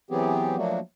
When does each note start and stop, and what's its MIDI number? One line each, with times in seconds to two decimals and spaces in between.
0.11 0.56 52
0.11 0.56 54
0.11 0.56 59
0.11 0.56 60
0.11 0.56 67
0.11 0.56 68
0.57 0.79 53
0.57 0.79 54
0.57 0.79 57
0.57 0.79 58
0.57 0.79 62
0.57 0.79 66